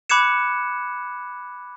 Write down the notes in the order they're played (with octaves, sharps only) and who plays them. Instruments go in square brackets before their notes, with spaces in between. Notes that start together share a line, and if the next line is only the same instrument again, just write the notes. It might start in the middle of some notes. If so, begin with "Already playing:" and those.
[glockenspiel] B5 D6 F#6 G#6 C#7 E7